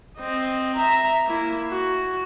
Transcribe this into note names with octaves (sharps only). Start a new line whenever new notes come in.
C4 D#5
E5 A#5
A#3 E4
F#4